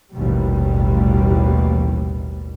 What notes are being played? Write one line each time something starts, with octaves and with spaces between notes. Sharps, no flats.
A1 D#2 B2 G3